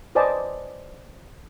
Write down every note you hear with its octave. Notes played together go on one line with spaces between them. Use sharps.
B4 C5 D5 D#5 G#5 A5